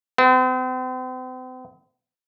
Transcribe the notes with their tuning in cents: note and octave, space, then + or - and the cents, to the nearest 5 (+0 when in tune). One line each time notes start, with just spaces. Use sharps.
C4 -40